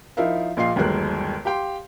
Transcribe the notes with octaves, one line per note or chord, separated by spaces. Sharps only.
F3 D#4 E4 A#4 E5 F5
A#1 A#2 D#5 F5 C7
G1 D#2 F#3 G#3 A#4 F#6
G4 F5 G5 C6